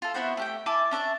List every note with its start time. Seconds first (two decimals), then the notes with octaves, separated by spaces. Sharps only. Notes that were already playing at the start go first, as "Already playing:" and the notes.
0.02 F4 A4
0.14 B3 E4 F#4 C5
0.37 A3 G4 G5
0.66 E4 G#5 A5 D6
0.91 C#4 D4 E5 A5